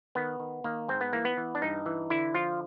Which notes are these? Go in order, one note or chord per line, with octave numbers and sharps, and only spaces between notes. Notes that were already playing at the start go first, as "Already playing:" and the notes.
D#3 B3
D#3
D#3 A#3
G#2 C4
B3
E3 A#3
B3
E3
D4
G2 D#4
E3
D3 E4
F3 F4